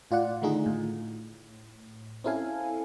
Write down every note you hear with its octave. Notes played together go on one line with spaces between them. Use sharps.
A2 F4 D5 F#5
D3 D#3 A3 D#4 F4 G#4
A2
C4 C#4 E4 A4 F5 G#5